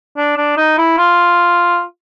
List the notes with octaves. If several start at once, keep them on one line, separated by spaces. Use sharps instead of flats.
D4
D4
D#4
E4
F4